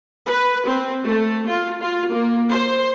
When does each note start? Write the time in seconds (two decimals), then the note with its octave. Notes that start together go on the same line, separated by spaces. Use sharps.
0.27 B4
0.66 C4
1.05 A3
1.48 F4
1.81 F4
2.12 A#3
2.51 C5